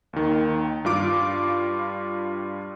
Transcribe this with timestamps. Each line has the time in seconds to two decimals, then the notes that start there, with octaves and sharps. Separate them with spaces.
0.13 D#2 D#3
0.85 G2 G3 F4 D6 D7